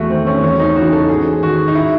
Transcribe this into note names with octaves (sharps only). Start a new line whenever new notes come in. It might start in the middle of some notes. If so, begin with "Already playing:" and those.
Already playing: E2 A3 F#4
D#3 C4
C#4
E2 C#4
D#4
C#3 E3 F#4
A4
G#2 G#4
D#3 F#4
D#4
E4